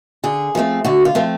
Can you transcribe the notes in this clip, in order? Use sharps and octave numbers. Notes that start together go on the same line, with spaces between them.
D3 G#4
F3 A3 C4
D3 F#4
F4
F3 A3 C4